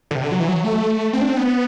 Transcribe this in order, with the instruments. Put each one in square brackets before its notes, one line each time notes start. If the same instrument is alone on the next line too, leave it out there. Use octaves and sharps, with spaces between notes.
[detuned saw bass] D3
C3
D3
F#3
E3
F#3
A3
C4
D4
C4
B3